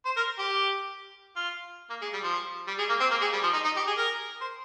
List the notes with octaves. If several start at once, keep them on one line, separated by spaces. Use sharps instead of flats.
C5
A#4
G4
F4
A#3
G#3
G3
F3
G3
G#3
A#3
C4
A#3
G#3
G3
F3
D#4
D#4
G4
G#4
A#4
C5